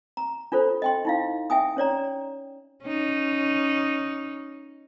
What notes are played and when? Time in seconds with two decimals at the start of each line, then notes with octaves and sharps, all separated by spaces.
0.17 A#5
0.52 D4 F4 A4 C5
0.82 D#5 G5 C6
1.05 D#4 E4 F5
1.50 E5 G5 G#5 D#6
1.77 C#4 C#5 D5 A#5
2.83 C#4 D#4